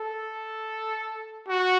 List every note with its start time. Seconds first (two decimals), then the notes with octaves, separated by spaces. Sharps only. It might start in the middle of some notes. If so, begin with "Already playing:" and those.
Already playing: A4
1.48 F#4